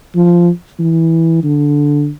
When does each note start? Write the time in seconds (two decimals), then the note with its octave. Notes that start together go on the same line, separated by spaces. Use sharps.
0.15 F3
0.79 E3
1.43 D3